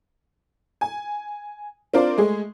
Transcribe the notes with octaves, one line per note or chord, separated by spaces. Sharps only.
G#5
C4 D4 F4 A#4 C5 D5
G#3 A3 G#4